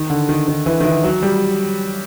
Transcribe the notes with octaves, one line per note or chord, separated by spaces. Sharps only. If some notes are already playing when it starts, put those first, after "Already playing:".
Already playing: D#3
D3
D#3
D#3
E3
D#3
E3
F#3
G3